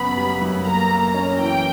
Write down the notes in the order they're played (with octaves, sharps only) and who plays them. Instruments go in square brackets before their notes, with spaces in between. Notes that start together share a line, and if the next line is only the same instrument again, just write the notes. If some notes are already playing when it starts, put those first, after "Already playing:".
Already playing: [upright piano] F#2 C#3 B3 [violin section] B5
[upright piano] G3
F#2
[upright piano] A#3 [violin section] A#5
[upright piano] A#3
C#4
[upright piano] E3 [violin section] G5